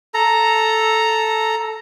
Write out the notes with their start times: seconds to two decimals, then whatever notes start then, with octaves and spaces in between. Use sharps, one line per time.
0.14 A4 A#5